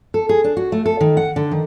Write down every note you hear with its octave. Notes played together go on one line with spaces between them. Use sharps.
A4
G#4
D4
F#4
A3
A4
D#3
F#5
D3
D#3